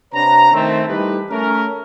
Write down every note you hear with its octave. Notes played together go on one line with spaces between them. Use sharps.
C3 D4 B4 C#5 F#5 A#5
D#3 A3 C4
E3 G3 A3 D#4 G4 B4
A3 C#4 A#4